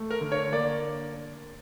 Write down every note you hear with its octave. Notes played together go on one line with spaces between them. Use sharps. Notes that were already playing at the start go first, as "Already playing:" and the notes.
Already playing: A3
A#4
D3
C#5
A#3 D5